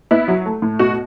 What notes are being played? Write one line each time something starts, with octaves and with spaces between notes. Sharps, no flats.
B3 E4
F#3
A3
A2
B2 F#4